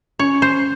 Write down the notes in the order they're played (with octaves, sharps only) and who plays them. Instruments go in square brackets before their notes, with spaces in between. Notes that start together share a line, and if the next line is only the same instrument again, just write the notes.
[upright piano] C#4 [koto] C#5
[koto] C5